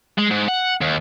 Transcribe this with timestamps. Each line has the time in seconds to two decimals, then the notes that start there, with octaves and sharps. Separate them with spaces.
0.18 G#3
0.30 G#2
0.48 F#5
0.81 D#2